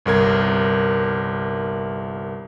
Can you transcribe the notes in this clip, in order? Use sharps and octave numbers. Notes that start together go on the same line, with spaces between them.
G1 C2 A#4 G#6